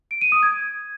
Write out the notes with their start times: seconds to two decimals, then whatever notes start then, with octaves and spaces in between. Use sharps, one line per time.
0.11 D7
0.21 D#7
0.32 D#6
0.43 G#6